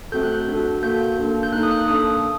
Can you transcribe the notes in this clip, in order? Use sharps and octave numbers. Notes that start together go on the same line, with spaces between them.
A3 C4 F#4 A4 G6
F#6
G6
D4 F#4 A4
A#3 F#4 A4 G6
A#3 D4 A4
G6
A#3 D#4 A4 F#6
D#6
F#6
A#3 D4 A4 D#6